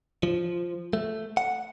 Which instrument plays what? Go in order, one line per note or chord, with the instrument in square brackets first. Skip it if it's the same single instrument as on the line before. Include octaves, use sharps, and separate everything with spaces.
[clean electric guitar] F3
A3
F#5